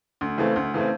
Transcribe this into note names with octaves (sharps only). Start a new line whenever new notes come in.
D2
C#3 E3 A3 C4
D2
C#3 E3 A3 C4